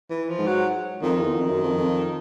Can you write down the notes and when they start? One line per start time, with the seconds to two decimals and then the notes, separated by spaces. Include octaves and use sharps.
0.10 E3
0.29 F3
0.38 G#2
0.47 F#3
1.03 F2 D#3
1.21 E2
1.35 F2
1.49 F#2
1.63 F2
1.78 F2